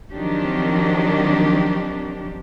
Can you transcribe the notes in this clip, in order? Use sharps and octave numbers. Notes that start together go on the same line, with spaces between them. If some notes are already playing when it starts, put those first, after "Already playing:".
D#3 F3 F#3 C4 D4 G4